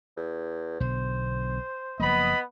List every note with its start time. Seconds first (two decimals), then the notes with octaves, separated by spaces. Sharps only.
0.17 E2
0.80 B1 B2 D3 C5
2.00 F#1 F3 A#3 B3 D#5 B5